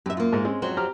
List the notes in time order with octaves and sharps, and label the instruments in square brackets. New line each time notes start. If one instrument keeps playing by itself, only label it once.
[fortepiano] F#2 [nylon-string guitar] G4 E5
[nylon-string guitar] A#3 F4
[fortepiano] G#2 G#3
G#3 C4 C#4
[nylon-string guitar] F2 F#3 C5
[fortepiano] G4 A#5 F6